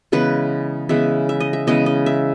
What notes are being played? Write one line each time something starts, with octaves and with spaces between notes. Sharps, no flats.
C#3 E3 G#3 B3 B4
C#3 E3 G#3 B3 E5
E5
D#5
E5
C#3 E3 G#3 B3 D#5
D#5
E5